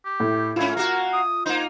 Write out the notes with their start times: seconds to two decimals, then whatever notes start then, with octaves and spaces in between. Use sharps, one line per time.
0.05 G4
0.20 A2
0.56 G#2 C#4 F4 E5 G#6
0.77 A#3 F#4 A#4
1.13 D#6
1.46 A#3 D#4 C5